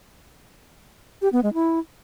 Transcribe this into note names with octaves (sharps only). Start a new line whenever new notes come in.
G4
B3
G#3
E4